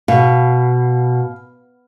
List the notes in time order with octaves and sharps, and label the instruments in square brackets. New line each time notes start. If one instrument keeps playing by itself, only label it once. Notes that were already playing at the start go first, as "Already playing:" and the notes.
[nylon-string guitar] B2 [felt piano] F5